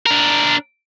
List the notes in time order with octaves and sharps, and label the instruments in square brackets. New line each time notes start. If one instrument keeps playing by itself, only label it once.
[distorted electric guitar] D4 A#4